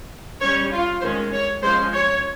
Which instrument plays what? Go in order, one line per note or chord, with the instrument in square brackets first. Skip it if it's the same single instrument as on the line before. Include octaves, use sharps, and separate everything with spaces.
[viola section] G3 C#4 C#5
F4
D#3 G#3 C#4 C5
C#5
F3 G#3 C#4 C5
C#5